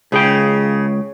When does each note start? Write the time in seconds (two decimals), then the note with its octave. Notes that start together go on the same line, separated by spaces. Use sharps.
0.12 C#2 C#3 G#4 G5